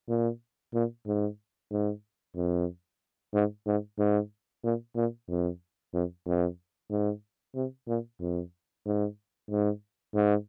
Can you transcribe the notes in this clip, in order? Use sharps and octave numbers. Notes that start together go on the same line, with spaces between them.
A#2
A#2
G#2
G#2
F2
G#2
G#2
G#2
A#2
A#2
F2
F2
F2
G#2
C3
A#2
F2
G#2
G#2
G#2